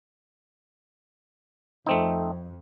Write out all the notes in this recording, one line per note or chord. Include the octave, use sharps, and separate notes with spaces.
F2 A3 C4 D#4